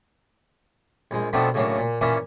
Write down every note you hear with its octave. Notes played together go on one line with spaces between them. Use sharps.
A#1 G#3
B2 F3 A3 B3 C4 D4
A2 C#3 F#3 A#3 D4
A#2
A#2 E3 A#3 C#4 D4 E4